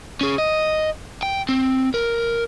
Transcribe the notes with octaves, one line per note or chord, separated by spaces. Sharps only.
C#4 G#4
D#5
G5
C4
A#4